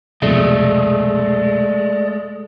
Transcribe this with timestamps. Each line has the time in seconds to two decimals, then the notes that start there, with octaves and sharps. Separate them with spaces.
0.22 C2 F2 B2 G#3 A3 D5